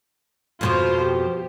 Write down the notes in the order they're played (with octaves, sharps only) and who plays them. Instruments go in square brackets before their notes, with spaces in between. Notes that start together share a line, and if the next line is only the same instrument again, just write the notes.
[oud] F2 B2 F3 [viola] F4 C5
[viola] G4